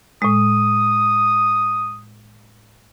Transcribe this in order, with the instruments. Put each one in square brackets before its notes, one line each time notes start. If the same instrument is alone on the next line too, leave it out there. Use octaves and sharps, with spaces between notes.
[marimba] A2 G#3 [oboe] D#6